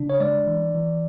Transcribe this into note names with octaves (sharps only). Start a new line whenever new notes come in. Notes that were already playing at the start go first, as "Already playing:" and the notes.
Already playing: C#3 D4
C#5
G#3 D5
E3
E3